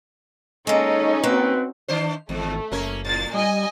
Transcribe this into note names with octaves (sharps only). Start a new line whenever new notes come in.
G#3 A#3 C#4 D#4 A4 D#5
A#3 C4 F#4 B4
D#3 D4 C5
G#1 E2 A3
F#1 A#3 C#4 A#4
A2 A6
G3 D#5 G#5